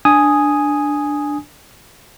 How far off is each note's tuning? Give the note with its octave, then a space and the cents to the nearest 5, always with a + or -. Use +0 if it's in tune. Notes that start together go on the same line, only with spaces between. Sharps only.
D4 +5 G#5 +0 D#6 +0